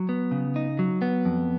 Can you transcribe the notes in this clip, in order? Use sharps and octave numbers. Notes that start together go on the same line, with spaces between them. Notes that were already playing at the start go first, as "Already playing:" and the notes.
Already playing: F#3
B3
C#3
D#4
F#3
B3
F2